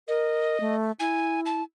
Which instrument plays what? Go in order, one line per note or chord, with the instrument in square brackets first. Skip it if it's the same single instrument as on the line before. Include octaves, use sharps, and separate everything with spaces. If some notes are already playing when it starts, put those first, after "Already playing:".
[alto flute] A#4 [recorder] D#5
[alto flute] A3
[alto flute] E4 [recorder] G#5
[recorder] A5